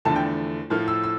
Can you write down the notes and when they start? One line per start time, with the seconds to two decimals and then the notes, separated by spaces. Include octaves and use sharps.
0.05 E2 D3 F3 A3 A5
0.16 G5
0.70 A2 F3 A3 F6
0.88 E6
1.04 E6